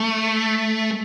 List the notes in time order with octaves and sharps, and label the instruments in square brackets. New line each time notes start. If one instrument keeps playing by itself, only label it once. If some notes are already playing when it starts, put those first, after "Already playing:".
Already playing: [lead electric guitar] A3